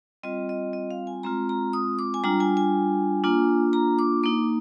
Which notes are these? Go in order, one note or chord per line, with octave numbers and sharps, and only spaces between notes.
G3 C4 F4 D#5
D#5
D#5
F5
G#5
G#3 C4 F4 A#5
A#5
D#6
D6
G#5
G3 D4 F4 A#5
G#5
G#5
A#3 D4 F4
A#5
D6
A#3 D#4 D6